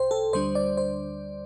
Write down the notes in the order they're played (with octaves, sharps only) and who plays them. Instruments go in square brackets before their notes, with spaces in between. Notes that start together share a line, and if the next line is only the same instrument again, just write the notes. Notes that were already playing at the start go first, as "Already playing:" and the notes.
Already playing: [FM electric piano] C2 C3 C5 G5
A4
D2 D3 G3 D4 C5
D5
C5